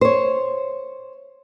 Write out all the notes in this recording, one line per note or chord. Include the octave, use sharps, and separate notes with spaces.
C5 C#5